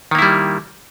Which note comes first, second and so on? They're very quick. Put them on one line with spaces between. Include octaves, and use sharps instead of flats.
D#3 A#3 E4 G3